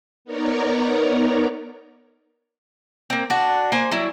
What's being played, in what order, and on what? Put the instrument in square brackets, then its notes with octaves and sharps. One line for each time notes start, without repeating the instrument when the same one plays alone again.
[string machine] B3 D#4 A#4 C#5 D5 A#5
[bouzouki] A#3 C4
D4 F#4
A#3 C5 G#5
F#3 G3 E4